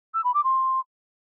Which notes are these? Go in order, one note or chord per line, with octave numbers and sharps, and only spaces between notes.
E6
B5
D6
C6